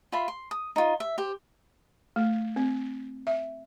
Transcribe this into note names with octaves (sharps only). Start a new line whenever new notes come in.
F4 E5 B5 C6
C6
D#6
D#4 F4
E5
G4 C5 G5
A3
C4
E5